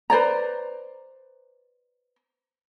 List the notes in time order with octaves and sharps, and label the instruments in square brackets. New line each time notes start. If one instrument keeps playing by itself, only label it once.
[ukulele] B4 C5 D5 A#5